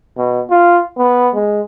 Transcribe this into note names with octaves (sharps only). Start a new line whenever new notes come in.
B2
F4
B3
G#3